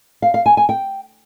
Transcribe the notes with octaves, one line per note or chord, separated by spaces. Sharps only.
F5
F5
G#5
G#5
G5